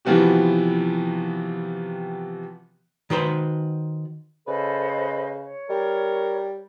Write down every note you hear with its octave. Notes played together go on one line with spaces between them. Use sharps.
C3 E3 F3 B3 F#4 G4
D#3 F#4 B4 C5
C#3 A4 B4 C5 D#5
C#5
G3 A#4